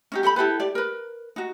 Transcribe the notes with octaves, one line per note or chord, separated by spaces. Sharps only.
C#4 D#4 G4
G4 A4 G#5 B5
E4 G4 A4 B4
G4 D5
A#4 B4
D#4 F#4